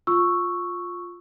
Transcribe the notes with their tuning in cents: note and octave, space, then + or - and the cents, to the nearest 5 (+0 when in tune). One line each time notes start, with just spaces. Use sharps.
F4 +10 C#6 +0 E6 +0